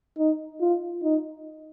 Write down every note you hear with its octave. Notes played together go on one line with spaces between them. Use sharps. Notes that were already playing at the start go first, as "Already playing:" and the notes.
D#4
F4
D#4